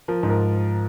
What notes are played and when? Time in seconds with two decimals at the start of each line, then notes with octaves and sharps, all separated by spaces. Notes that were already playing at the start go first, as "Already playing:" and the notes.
0.08 F3 A#4
0.23 G#2
0.30 A#4